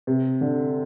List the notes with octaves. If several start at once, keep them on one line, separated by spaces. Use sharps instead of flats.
C3
D3